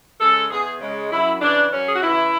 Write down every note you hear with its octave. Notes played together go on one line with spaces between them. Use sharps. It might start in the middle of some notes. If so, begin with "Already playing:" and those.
C#3 G#3 A4
E2 G#4
C#3 G#3
F#2 E4
C#3 E3 D4
F#2 C#4
G#4
F#4
C#3 E3 E4